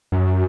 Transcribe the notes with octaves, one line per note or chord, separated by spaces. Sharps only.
F#2